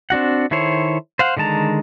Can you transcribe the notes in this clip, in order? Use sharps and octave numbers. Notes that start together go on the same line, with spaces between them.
C4 D4 F#4 F#5
D#3 E4 A4 C5 C#5
C5 F5 F#5
D3 D#3 G#3 A5 A#5